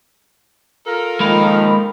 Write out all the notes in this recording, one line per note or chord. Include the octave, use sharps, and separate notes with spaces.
F4 A4 A#4
D#3 F3 G#3 A#3 F5 B5